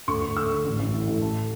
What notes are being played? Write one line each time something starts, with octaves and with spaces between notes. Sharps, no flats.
D2 C#6
D2
D2 E6
D3
A1
A1
E3
A1
A1 A5